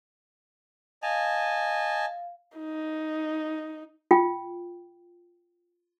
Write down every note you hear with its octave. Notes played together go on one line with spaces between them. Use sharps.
D#5 F5 G#5 A5
D#4
F4 G5